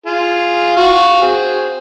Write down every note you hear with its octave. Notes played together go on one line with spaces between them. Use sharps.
F4 G#4
F#4 F5 F#5
C4 G#4